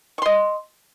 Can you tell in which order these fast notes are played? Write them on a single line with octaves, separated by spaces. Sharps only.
C#6 C6 D#5